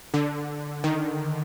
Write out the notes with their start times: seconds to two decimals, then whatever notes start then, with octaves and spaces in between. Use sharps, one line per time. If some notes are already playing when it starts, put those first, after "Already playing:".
0.14 D3
0.84 D#3